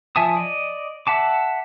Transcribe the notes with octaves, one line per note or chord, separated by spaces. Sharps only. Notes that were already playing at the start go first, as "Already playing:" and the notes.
F3 E5 G#5 A5 D#6
D5 D#5
E5 F#5 A5 D6